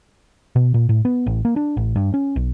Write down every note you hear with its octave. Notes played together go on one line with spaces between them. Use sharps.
B2
A#2
A2
B3
A1
A#3
D4
A1
G2
C#4
B1